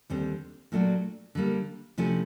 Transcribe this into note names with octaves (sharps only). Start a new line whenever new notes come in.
D#2 D3 G3 C4
A#2 F#3 A3 D4 F#4
D3 G3 A#3
C3 F3 A3 C#4 E4